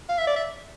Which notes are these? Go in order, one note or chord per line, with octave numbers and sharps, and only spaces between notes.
F5
E5
D5
E5